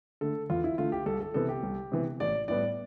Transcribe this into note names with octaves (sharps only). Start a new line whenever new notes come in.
D3 A3 A4
E2 F4
E4
D3 A3 F4
G4
C2 A4
A4
C3 E3 B3 A4
G4
C2
C3 E3 B3
A1 D5
A2 G3 B3 D5